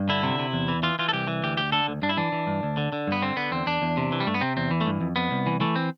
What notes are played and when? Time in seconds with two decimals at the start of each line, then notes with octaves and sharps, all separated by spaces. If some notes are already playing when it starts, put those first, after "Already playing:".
Already playing: G2
0.09 D3 E4
0.23 C3
0.39 C3
0.53 E2
0.68 E3
0.83 E3 F4
0.99 E3 F4
1.09 A4
1.13 C2 G4
1.28 E3
1.44 D2 G4
1.57 D2 G4
1.72 D3 A4
1.88 D2
2.02 G2 D4
2.09 E4
2.17 E3 D4
2.32 E3
2.47 G2
2.63 D2
2.77 D3
2.93 D3
3.07 G2 B3
3.22 D3 C4
3.36 D3 B3
3.51 E2 C4
3.66 E2 D4
3.82 E2
3.97 C3
4.12 E3
4.20 G3
4.27 G2 A3
4.34 B3
4.41 C3 C4
4.57 E2 C4
4.71 E3
4.81 A3
4.87 G2
5.01 F2
5.16 F2 B3
5.31 C2
5.47 E3
5.60 E3 A3
5.76 C4